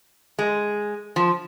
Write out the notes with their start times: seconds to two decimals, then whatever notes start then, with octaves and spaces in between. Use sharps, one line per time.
0.39 G#3
1.16 F3